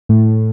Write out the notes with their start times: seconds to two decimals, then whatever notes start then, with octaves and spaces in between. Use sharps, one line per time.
0.09 A2